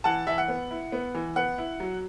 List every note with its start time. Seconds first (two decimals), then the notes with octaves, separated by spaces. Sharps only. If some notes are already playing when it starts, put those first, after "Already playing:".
0.04 E3 F#5 A5
0.27 E3 E5
0.38 F#5
0.48 B3
0.71 E4
0.92 B3
1.14 E3
1.36 B3 F#5
1.58 E4
1.80 F#3